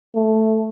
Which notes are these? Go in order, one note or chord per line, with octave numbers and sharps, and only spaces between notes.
A3